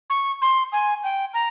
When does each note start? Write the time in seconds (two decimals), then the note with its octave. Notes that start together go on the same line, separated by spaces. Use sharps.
0.10 C#6
0.42 C6
0.72 G#5
1.04 G5
1.34 A#5